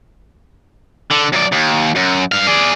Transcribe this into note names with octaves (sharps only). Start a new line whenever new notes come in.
D3
F#2 D5
D#2
F#2
G2 F5
G#4 D5